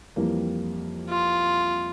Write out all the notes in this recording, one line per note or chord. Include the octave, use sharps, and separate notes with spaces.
F2 E3 G3 A#3 E4
F4